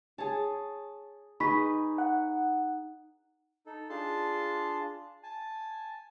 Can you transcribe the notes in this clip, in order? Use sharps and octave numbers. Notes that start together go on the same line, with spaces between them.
G#4 C#5 A5
D#4 G#4 B4 B5 C#6 B6
F#5
D#4 A4
D4 F4 G#4 A5 C6
G#5 A5